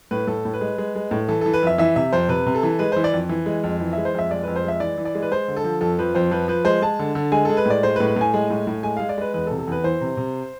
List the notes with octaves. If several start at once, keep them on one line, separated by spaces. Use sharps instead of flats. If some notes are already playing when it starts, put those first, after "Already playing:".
A2 B4
A2 A4
A2
B4
G#3
G#3
G#3
A2
E3 A4
E3 A4
B4
F2 E5
E3 E5
C3 E5
F2 C5
C3 B4
C3
A4
E3
G#3 B4
E3 C5
D5
F2
E3
G#3
F2
E3
G#3 E5
C5
F2 E5
G#3 D5
F2 B4
C5
G#3 E5
E3 D5
E3
D5
G#3
B4
G#3 C5
D3
A4
F3
F2 A4
F3 B4
F2 C5
F3 B4
F3 B4
G#3 C5
G#3 A5
D3
D3
G#3 G#5
G#3 A4
B4
A2 D5
G#3 C5
B4
A2
B4
A2 G#5
G#3
A2
A2
G#3 G#5
G#3 F5
D5
G#3 B4
E2 B4
A4
C3
A4
E2 B4
E3 C5
C3
C3